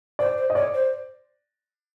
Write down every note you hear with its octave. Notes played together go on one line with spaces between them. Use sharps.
C5 D5
C5
D#5
C#5 D5
C5